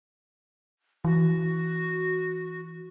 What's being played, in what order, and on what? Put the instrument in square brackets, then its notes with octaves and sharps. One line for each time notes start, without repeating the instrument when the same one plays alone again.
[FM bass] E3 [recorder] F#4